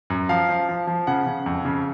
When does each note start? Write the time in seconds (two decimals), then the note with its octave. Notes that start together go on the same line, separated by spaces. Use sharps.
0.10 F#2
0.29 F3 F5
0.49 F3
0.69 F3
0.87 F3
1.07 C#3 F#5
1.27 C#3
1.46 F2
1.65 C#3